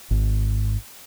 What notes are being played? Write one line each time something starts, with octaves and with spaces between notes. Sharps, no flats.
G#1